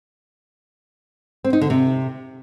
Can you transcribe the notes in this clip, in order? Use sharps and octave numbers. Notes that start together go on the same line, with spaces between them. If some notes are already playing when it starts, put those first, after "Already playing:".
C4
D#4
D3
C3